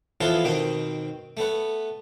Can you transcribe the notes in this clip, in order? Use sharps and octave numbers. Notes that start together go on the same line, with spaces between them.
E3 F3 B3 F4 G#4 A4
B2 D#3 C4 D#5
A3 B3